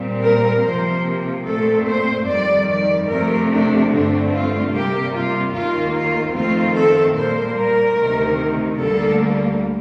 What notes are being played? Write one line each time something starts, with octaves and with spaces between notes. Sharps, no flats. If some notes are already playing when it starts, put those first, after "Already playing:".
Already playing: A#2 G3 C4
A#4
C3 F3 A#3 C5
A#2 A3 C4 A4
C5
F2 D#3 G3 D5
D5
F2 C3 F3 A3 A#4
D4
G2 D3 A3 C4 D4
F4
C3 G3 A#3 G4
F4
D#2 D#3 A#3 F4
F4
F2 D#3 A3 C4 F4
A4
A#2 G3 A#3 C5
A#4
D2 C3 D#3
D2 D3 G3 A#3 A4